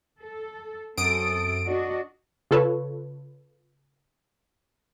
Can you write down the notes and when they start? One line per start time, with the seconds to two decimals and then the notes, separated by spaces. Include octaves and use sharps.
0.21 A4
0.98 F#2 C4 A4 D#6 D7
1.65 D4 F#4 D#5
2.51 C#3 F4 A4 B4 C#5